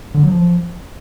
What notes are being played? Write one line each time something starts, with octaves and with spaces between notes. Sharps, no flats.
D3
F#3
F3